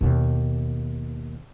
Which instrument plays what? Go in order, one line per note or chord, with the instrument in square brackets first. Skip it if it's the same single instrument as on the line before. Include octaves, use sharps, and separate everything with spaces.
[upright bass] D#2 B2